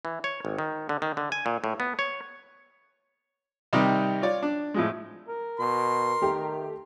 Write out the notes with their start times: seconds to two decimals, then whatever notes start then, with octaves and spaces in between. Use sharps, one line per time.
0.05 E3
0.24 C#5
0.45 G#1
0.58 D#3
0.89 D3
1.02 D#3
1.17 D3
1.32 G#5
1.46 A#2
1.64 A2
1.80 B3
1.99 C#5
3.73 C3 D#3 G3 D#4 G4
4.22 F4 C#5 D5
4.42 D4
4.74 A2 F3 G#3
5.28 A#4
5.59 B2 C6
6.22 D#3 A3 G4